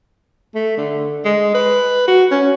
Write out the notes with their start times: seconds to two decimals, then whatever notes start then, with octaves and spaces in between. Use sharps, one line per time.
0.55 A3
0.78 D3
1.25 G#3
1.54 B4
2.08 F#4
2.31 C#4